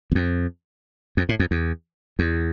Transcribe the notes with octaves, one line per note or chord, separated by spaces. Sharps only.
E2
F2
F2
A2
F2
E2
E2